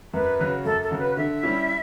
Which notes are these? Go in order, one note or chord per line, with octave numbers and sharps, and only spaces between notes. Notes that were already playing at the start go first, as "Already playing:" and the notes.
F#2 B4
C#3 F#3
F#2 A4
A4
C#3 F#3
B4
D3 E5
G3 C#4 E4